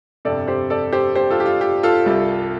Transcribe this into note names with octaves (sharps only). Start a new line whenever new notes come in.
G1 F2 C3 A4 D5
G4 C5
A4 D5
G4 C5
G4 C5
F4 A4
G4
F4
G4
F4 A4
C2 C3 G3